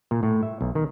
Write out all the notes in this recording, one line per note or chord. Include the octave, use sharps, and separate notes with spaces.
A#2
A2
E5
B1
D#3